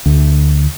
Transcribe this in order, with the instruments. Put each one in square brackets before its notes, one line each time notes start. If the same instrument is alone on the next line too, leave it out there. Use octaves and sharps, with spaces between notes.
[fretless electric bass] D2